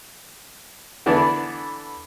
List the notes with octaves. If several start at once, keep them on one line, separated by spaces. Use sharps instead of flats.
D3 E3 B3 D4